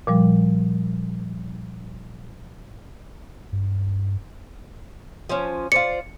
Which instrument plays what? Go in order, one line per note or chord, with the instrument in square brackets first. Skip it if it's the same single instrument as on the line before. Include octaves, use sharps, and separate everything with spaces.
[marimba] A#2 F3 G3
[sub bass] G2
[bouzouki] F3 C#4
[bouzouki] F4 C5 D5 [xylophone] C#7